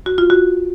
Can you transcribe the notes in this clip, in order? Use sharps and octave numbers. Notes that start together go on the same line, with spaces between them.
F#4
F4
F#4